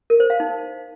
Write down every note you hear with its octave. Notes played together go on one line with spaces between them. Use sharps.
A#4
C5
F5
D#4